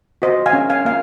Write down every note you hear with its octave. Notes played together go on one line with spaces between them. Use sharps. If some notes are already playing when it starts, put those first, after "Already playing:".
F#4 C5 D#5
F5 G#5
C#4
F5 G#5
A#3 F5